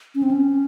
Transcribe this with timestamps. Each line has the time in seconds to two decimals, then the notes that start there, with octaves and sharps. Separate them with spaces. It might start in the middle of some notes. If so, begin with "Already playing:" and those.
0.15 C#4
0.23 C4
0.31 C#4